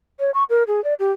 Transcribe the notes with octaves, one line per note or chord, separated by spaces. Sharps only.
C#5
C#6
A#4
G#4
D5
G4